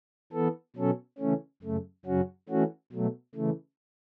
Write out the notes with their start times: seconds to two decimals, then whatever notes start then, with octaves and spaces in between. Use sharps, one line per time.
0.32 E3 B3 A4
0.76 B2 F#3 C#4 A4
1.18 C#3 E3 A3 C#4
1.62 F#2 C#3 A3
2.05 F#2 C#3 F#3 C#4 F#4
2.49 E3 A3 C#4 F#4
2.92 B2 F#3 A3
3.35 C#3 E3 A3